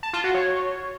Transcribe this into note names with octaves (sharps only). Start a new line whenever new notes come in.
A5
F4
F#4
C#5